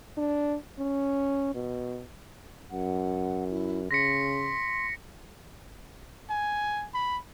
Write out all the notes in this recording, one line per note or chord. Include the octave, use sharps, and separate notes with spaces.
D4
C#4
B2
F#2 F#5
E4
C#3 C6 A#6 B6 C#7
G#5
B5